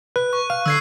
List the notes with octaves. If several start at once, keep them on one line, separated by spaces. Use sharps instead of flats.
B4 F#6
C#6
F5 D#7
D3 E6 G#6 C7